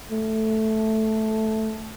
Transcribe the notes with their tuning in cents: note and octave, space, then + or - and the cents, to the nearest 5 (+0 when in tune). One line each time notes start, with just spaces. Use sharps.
A3 -5